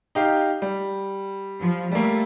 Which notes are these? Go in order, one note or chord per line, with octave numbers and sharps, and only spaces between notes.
D#4 G4 F5
G3
F3
G3 A3 A#3